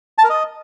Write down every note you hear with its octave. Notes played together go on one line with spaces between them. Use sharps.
A5
A#4
D#5